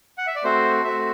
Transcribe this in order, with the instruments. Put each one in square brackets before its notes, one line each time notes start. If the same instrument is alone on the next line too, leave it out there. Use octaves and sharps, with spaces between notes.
[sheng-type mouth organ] F#5
E5
D5
A3 C4 F#4 C5
A3 C4 F#4 E5